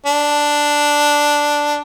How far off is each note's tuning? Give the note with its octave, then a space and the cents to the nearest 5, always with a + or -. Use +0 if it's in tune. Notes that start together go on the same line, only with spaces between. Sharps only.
D4 +0